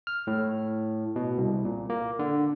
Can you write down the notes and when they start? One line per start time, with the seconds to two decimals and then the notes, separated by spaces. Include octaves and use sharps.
0.07 F6
0.27 A2
1.16 B2
1.38 C2
1.65 A#2
1.90 A#3
2.19 D3